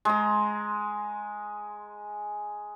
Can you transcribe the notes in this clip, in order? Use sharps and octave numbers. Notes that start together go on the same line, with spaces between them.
G#3 A#5